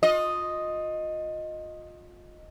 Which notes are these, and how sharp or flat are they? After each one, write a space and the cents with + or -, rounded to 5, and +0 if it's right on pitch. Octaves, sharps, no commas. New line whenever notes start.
F4 +30 D#5 +0